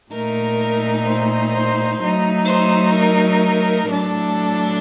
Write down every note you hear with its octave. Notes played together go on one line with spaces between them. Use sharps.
A#2 A3 D#4 A#4
C5
C5
F#3 A3 D#4
C5
A#4
A2 F#3 A3 D4 A4